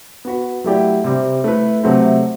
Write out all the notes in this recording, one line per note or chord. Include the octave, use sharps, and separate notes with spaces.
B3 F#4 B4
F#3 A3 E4 G4 D5
C3 G3 C4
A3 E4 B4
C3 F#3 A3 C4